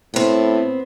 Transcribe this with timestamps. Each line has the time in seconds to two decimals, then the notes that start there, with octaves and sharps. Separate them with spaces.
0.14 A2 B3 C4